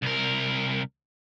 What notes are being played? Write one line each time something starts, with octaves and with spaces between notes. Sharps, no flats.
C2 A#4